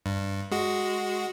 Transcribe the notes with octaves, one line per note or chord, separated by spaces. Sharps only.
G2
G#3 F#4